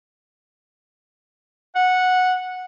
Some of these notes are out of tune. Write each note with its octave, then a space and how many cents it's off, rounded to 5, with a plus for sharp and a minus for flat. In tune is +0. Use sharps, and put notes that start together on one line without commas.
F#5 -10